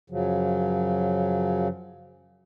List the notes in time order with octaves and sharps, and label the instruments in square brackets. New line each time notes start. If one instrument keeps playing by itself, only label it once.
[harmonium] F#2 C#3 F3 F#3